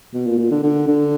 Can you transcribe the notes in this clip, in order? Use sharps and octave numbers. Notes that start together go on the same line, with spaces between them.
B2
A#2
A#2
D3
D3
D3